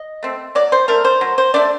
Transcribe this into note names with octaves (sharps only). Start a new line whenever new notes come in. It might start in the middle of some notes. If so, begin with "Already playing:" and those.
Already playing: D#5
A3 C4
F#3 D5
C5
A3 D4 A#4
C5
F#3
C5
A3 D4 D5